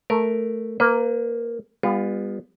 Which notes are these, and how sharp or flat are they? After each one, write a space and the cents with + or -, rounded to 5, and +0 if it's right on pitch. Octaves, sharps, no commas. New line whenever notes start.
A3 +0 A#4 +0
A#3 +0 B4 +35
G3 +45 B3 +0 F4 +10